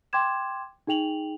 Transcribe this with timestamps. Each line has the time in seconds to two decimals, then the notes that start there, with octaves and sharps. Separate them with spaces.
0.13 G5 C6 D6 G#6 E7
0.87 D#4 G#4 G5 F7 F#7